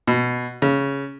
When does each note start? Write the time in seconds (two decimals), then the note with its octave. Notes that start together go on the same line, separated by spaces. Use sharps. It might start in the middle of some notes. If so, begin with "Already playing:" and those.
0.08 B2
0.62 C#3